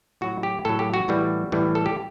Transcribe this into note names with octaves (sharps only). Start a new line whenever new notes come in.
A2 F#3 F#4
G4
A2 F#3 A4
G4
F#4
A2 E3 G3
A2 E3 G3
A4
G4